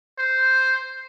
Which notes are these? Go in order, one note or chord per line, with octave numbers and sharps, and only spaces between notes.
C5